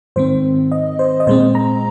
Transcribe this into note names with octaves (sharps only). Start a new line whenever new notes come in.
G#2 D#3 C4 C5
D#5
C5
D#5
A#2 G#3 C4 C5
A#5